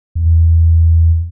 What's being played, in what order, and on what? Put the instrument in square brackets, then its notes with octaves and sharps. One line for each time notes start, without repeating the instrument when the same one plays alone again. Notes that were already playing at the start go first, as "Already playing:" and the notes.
[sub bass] E2